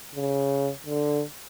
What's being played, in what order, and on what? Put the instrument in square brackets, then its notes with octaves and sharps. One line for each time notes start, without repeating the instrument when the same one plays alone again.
[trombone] C#3
D3